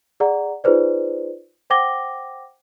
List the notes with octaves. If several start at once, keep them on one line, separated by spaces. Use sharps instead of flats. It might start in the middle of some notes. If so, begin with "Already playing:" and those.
G#4 D5 F#5 A#5
D#4 F4 G#4 B4 C5 D5
C5 F#5 G5 D6 A#6 G7